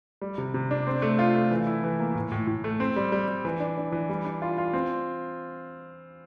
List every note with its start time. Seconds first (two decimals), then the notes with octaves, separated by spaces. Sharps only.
0.22 G3
0.38 C3
0.54 C3
0.71 D4
0.87 C4
1.02 A3
1.19 F4
1.35 A3
1.51 E3
1.67 E4
1.84 E3
2.00 A#3
2.15 A2
2.32 A2
2.47 A2
2.64 A3
2.80 C4
2.96 G3
3.12 G3
3.28 G3
3.45 E3
3.60 D4
3.78 D4
3.92 E3
4.09 G3
4.25 D4
4.42 F4
4.58 F4
4.73 C4